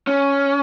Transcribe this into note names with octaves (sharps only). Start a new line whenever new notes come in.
C#4